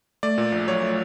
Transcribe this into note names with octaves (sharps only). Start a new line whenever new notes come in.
A3 D5
A#2
A#1
F#3 C#5
A3